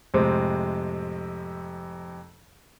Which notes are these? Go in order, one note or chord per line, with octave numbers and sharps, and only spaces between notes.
F2 A2 C3 G#3 C4